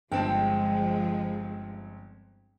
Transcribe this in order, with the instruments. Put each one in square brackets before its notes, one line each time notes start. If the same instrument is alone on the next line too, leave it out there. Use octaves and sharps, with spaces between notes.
[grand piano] G1 C4 A5 [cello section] F3 G#3 [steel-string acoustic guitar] G5